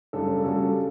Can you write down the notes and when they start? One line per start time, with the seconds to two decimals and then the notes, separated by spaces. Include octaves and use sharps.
0.13 F#2 C#3 G3 D4 A4
0.44 C#3 G3 C#4 F#4 A4